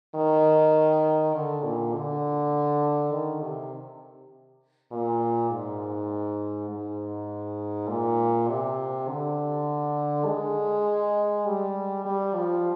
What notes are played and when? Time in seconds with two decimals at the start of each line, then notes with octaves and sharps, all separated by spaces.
0.15 D#3
1.35 D3
1.64 A#2
1.94 D3
3.12 D#3
3.42 C3
4.92 A#2
5.50 G#2
6.69 G#2
7.88 A#2
8.48 C3
9.08 D3
10.26 G#3
11.46 G3
12.05 G3
12.35 F3